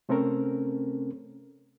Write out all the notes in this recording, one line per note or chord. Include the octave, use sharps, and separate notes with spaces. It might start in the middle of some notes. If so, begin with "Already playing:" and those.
C3 A3 C4 C#4 A4 A#4